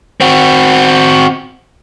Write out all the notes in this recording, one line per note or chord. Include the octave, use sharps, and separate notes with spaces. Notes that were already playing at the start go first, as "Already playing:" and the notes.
C4 F#4